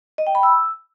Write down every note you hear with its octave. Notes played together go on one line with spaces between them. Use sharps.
D#5
G5
B5
E6